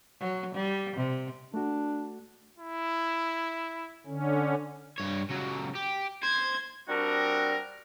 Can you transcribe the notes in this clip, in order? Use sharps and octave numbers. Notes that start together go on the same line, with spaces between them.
F#3
G3
C3
A3 D4 F#4
E4
D3 C#4
G2 C#5
C#2 F#3
G4
C5 G#6
G3 C4 D4 F#4 A#4